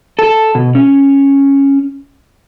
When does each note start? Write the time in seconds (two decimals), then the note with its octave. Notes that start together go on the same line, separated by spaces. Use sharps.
0.19 A4
0.55 B2
0.75 C#4